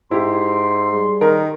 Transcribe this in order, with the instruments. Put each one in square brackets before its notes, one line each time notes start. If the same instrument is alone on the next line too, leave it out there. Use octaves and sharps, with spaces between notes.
[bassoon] G#2 [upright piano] E4 G4 [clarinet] C6
[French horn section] G3 G#4
[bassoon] D#3 [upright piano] A#4